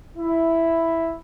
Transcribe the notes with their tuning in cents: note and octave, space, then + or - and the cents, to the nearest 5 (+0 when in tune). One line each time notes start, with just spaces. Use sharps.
E4 +0